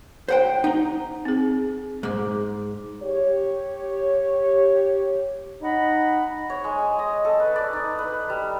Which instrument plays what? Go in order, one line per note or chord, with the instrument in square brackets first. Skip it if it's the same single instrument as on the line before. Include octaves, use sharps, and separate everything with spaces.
[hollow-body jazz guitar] C5 F#5 G5
[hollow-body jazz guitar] D#4 [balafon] F#5 A#5
[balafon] C4 G#4
[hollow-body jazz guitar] G#2 [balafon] G#4 D6
[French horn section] G4 C#5
[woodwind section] D#4 D#5 F#5 B5
[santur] C#5
G#3
G#5
D#5
A4
B4
D5
D#4
B4
G3